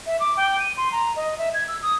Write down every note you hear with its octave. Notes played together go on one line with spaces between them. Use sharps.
E5
D6
G5
D#7
C6
A#5
D#5
E5
G#6
E6
D#6